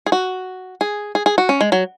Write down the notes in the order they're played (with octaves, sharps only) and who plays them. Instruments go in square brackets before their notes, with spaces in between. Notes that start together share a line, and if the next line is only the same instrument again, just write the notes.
[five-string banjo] G#4
F#4
G#4
G#4
G#4
F#4
C#4
G#3
F#3